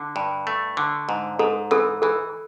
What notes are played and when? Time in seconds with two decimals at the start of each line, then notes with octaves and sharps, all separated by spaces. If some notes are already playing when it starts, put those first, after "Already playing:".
Already playing: D3
0.16 G2
0.47 A3
0.77 D3
1.09 G#2
1.39 G#2 A4
1.71 E3 A4
2.02 E3 A4